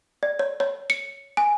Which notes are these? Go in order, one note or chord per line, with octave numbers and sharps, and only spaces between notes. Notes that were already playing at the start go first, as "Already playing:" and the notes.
D5
C#5
C#5
C#7
G#5